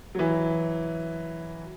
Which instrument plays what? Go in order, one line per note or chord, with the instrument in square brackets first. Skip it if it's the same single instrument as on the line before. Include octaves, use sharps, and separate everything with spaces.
[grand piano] E3 F#3